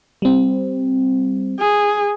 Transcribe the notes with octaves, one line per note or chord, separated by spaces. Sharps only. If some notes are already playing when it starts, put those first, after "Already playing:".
G3 C4
G#4